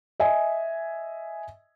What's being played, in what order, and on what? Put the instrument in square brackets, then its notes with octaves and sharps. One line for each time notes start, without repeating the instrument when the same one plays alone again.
[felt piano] D#5 E5 G#5